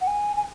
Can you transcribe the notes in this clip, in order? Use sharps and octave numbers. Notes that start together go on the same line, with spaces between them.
F#5
G#5
G#5